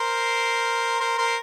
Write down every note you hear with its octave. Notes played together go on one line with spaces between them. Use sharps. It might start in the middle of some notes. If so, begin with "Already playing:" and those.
Already playing: A#4 C5
A#4 C5
A#4 C5